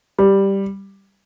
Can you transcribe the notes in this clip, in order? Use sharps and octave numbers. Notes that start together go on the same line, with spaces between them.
G3